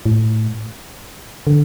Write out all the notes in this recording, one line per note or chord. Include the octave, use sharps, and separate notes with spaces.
A2
D3